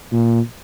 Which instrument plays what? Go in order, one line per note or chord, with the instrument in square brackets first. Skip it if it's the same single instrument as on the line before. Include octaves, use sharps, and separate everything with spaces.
[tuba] A#2